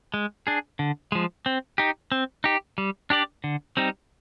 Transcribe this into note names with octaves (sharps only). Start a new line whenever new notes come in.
G#3
D4 G#4
D3
F3 G#3
C4
D#4 G4
C4
D#4 G4
G3
D4 G4 D5
D3
G3 C4 D#4